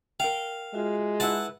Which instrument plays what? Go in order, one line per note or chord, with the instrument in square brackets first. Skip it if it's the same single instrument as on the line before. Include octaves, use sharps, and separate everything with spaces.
[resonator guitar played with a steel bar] A#4 G5 [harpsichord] F5
[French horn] G#3 [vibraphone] F4 F#4 E5
[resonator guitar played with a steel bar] E4 B4 [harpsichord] F#5 A5